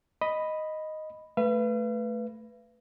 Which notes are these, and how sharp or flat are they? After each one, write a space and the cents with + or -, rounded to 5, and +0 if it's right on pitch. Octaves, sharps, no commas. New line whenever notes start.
D#5 +0 B5 +0
A3 +0 B4 +0 F5 -45